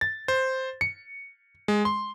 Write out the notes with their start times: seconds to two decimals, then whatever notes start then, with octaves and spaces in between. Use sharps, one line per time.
0.01 A6
0.28 C5
0.81 C#7
1.68 G#3
1.85 C6